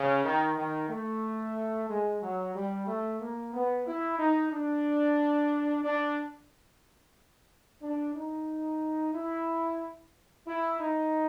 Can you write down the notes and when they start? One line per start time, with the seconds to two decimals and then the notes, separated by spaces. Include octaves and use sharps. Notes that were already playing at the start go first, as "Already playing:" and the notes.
Already playing: C#3
0.24 D#3
0.57 D#3
0.89 A3
1.89 G#3
2.21 F#3
2.55 G3
2.87 A3
3.20 A#3
3.53 B3
3.87 E4
4.19 D#4
4.52 D4
5.84 D4
7.82 D4
8.15 D#4
9.14 E4
10.46 E4
10.79 D#4